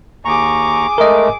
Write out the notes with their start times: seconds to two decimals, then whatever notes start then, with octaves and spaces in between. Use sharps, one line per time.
0.25 D#2 G#4 A#5 C#6 D6
0.98 G#3 A3 A#4 D#5